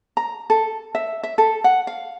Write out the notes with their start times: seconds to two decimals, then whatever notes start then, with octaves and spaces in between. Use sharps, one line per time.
0.17 A#5
0.50 A4
0.95 E5
1.23 E5
1.38 A4
1.64 F#5
1.87 F5